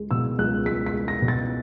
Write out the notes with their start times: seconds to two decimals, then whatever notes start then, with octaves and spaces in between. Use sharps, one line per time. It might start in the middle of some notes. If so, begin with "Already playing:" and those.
Already playing: C#2 G#3
0.11 B2 E6
0.38 C#2 F#6
0.66 C#2 B6
0.86 B6
0.94 G#3
1.08 A#6
1.22 B2
1.28 A6